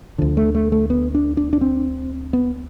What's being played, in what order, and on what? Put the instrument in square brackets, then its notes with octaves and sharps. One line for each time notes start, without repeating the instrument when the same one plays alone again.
[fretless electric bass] D2 D3 F3
A3
A3
A3
B3
D4
D4
D4
C4
B3